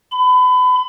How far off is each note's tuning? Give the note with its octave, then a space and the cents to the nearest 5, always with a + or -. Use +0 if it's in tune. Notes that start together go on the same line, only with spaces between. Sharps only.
B5 +30